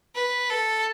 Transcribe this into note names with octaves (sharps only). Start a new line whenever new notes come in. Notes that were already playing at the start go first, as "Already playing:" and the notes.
B4
A4